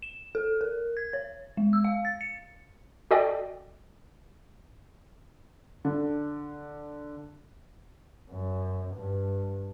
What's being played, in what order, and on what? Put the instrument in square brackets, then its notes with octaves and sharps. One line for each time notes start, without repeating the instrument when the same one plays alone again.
[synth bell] E7
A4
A#4
G#6
C#5
G#3
E6
F5
A6
C#7
[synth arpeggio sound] F#4 A4 D5 D#5 G5
[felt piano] D3
[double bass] F#2
G2